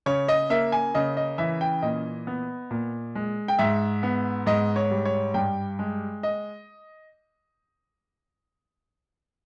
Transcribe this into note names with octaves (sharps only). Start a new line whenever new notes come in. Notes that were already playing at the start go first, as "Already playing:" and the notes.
C#3 C#5
D#5
A#3 E5
G#5
C#3 D#5
D#5
E3 E5
G5
A#2 D#5
B3
A#2
G#3
G5
G#2 E5
B3
G#2 D#5
C#5
G3
C#5
G2 G5
G#3
D#5